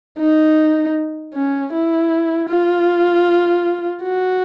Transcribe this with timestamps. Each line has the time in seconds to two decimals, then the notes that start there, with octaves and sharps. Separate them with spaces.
0.19 D#4
1.34 C#4
1.73 E4
2.50 F4
4.03 F#4